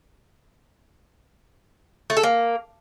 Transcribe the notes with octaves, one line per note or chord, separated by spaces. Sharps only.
A3
A4
A#3